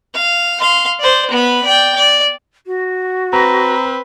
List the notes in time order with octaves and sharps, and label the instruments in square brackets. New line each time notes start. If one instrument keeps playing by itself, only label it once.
[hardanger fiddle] F5
F5 C6
C5 D5
B3 B5
D5 G5
D5
[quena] F#4
[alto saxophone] C4 [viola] B4 [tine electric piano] A#5